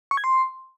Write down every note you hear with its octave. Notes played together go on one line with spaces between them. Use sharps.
C#6
G#6
C6